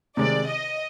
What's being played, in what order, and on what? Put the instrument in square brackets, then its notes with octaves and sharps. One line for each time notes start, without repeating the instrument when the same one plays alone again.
[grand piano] C3 D#3 G#3 [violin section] D5
[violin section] D#5